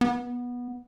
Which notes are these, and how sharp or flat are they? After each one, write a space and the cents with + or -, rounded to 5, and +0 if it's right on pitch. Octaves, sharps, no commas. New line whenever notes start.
B3 -15